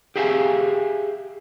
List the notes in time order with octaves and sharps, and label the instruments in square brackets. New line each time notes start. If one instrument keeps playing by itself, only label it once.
[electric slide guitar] G4 G#4 E5 F5 G5 G#5